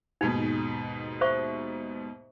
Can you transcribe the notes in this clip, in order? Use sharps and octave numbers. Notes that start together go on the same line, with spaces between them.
D#2 G#2 B2 D#4
C5 E5 C#6